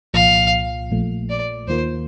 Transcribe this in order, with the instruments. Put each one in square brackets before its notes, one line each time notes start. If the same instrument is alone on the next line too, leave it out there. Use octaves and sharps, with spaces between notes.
[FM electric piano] C2 A#2 F3 [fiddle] F5
[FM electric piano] A#1 A#2 F3 A3
[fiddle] D5
[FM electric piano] D#2 D#3 A#3 F4 A#4 [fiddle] C5